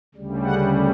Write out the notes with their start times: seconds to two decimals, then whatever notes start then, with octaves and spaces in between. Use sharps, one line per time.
0.15 D2 C#3 G3
0.45 F#5